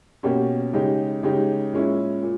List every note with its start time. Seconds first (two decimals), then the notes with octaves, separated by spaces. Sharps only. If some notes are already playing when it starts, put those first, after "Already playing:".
0.23 B2 A#3 C#4 G4
0.73 C#3 G#3 D#4 G4
1.23 C#3 G#3 D#4 G4
1.73 A#2 G#3 C#4 E4
2.22 A#2